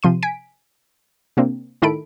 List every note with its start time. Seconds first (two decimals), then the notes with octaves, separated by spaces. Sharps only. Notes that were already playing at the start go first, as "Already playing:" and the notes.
0.03 C3 F3 C6 D#7
0.23 G#5 B6 D7
1.37 C3 A#3 C4 D4
1.82 A2 D#3 E4 A4 B5 D7